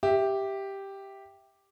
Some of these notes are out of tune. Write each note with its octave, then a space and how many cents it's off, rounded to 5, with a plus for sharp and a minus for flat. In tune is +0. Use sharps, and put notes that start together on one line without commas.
G4 +0 E5 +0